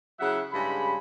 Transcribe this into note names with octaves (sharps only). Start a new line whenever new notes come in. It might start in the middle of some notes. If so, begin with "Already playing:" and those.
C#3 F#3 E4 E5 F#5
G2 C#3 G#3 B5